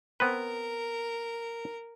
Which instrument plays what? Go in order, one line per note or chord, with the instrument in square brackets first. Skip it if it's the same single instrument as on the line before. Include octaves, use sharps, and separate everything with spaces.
[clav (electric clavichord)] B3 C4 B4 [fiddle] A#4